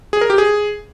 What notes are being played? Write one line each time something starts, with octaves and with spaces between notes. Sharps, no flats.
G#4
A#4
G4
G#4